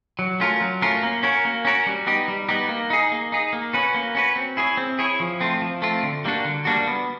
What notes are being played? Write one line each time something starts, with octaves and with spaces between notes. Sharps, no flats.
F#3
A3 C#4 F4 A#4
F#3
A3 C#4 F4 A#4
A#3
C#4 F#4 A#4 C#5
A#3
C#4 F#4 A#4 C#5
G3
B3 D#4 G4
G3
B3 D#4 G4
A#3
D#4 G#4
A#3
D#4 G#4
A#3
C#4 F#4 B4
A#3
C#4 F#4 B4
C4
E4 G#4 C#5
C4
E4 G#4 C#5
F3
A3 C4 F4
F3
A3 C4 F4
D3
G3 A#3 D4 F#4
D3
G3 A#3 D4 F#4
B3